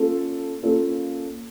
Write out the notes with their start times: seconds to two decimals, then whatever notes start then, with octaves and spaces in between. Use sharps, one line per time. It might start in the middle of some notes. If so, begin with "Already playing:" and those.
Already playing: A#3 C#4 F4 A4
0.63 A#3 C#4 F4 A4